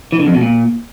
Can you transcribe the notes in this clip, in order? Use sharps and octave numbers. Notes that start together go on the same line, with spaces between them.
E3
D3
F2
B2
A#2